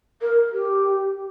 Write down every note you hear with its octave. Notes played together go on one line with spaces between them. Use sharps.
A#4
G4